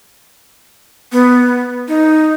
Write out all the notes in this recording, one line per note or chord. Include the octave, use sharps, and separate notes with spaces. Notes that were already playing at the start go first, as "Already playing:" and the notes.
B3
D#4